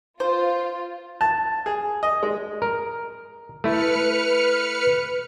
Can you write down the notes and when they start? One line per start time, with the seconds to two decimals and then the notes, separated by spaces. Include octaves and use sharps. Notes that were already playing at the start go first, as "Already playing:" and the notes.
0.20 F4 C5
1.21 A5
1.66 G#4
2.03 D#5
2.23 G#3
2.62 A#4
3.64 A3 E4 B4 F6 C#7